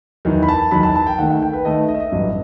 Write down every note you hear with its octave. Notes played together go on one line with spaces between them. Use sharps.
E2 D#3 F#3
B5
A5
E2 D#3 F#3 B5
A5
A5
G5
D#2 D#3 A3 F#5
F#5
G5
B4
D#2 D#3 A3 D#5
E5
D#5
E5
D#5
A1 G2 F#3